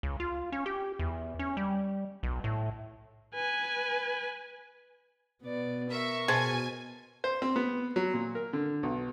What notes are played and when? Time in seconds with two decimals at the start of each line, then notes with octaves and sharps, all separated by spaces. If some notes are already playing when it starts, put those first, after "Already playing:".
0.03 C#2
0.20 F4
0.52 C#4
0.66 G4
0.99 E2
1.39 C#4
1.57 G3
2.23 B1
2.44 A2
3.34 B4 G#5
5.42 B2 B3 D5
5.90 A#4 E5 C#6
6.28 B2 G#4 C5 G#5 A5
7.24 C5
7.42 C4
7.56 B3
7.96 F#3
8.14 A#2
8.35 A#4
8.53 D3
8.83 B1